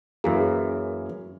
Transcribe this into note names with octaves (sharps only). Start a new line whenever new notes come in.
F#2 E3 A#3 G#4